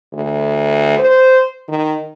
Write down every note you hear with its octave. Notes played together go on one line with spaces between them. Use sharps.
D2
C5
D#3